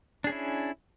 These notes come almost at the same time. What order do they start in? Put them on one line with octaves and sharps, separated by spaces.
D4 G#4 C#4 E4